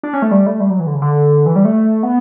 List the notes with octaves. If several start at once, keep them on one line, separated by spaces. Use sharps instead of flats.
D4
C#4
A3
G3
A3
G3
F#3
E3
D3
C#3
D3
E3
G3
A3
B3